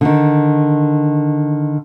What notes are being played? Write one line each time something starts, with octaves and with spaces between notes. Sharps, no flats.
D3 D#3